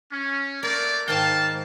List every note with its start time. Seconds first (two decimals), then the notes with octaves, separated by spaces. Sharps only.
0.11 C#4
0.63 A3 A#3 A#4 D5
1.08 G#2 D#3 F5 G5 A5